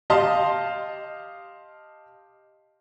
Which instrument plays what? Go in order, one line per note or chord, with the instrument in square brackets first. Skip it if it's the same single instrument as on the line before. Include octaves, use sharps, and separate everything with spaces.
[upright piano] G4 D#5 F5 A5 C6